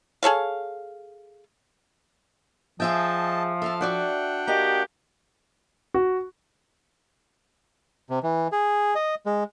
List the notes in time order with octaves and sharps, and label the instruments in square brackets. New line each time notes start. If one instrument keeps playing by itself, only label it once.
[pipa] G#4 A4 C#5 F5
[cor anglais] F3 [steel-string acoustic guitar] G#4 E5 G5 [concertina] D#5 A5
[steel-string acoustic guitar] A4 F5 A5 [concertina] E5
[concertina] D4 F#5 G5 [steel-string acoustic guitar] F#4 D5 E5
[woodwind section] A#3 F#4 G4 [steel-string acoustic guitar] D#5 A#5
[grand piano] F#4
[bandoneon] C3
E3
G#4
D#5
G#3